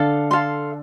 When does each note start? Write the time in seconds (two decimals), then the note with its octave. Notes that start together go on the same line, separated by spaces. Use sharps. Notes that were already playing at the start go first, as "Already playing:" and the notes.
Already playing: D3 D4 A4 F5
0.31 A4 F5 C6